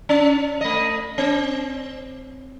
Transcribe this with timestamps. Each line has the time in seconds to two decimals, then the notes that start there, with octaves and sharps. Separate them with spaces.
0.09 C#4
0.61 A3 D#5
1.18 C4